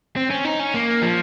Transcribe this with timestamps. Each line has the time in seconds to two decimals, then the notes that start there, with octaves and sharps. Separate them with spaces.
0.16 C4
0.30 C#4
0.45 D#4
0.60 C#4
0.74 A#3
1.02 F3